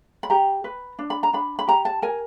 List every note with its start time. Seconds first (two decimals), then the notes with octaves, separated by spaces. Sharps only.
0.23 B5
0.30 G4 A#5
0.64 B4
0.99 D4
1.10 B5
1.23 A#5
1.33 D4 B5
1.59 B5
1.67 G4 A#5
1.85 A5
2.02 A#4 G#5